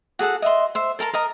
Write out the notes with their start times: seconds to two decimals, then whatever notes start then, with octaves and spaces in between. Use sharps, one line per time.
0.19 F#4 G#4 A4 F#5
0.42 D#5 E5 C6
0.75 C5 E5
0.99 A4 A#4 A5 A#5
1.13 A#4 D#5 A#5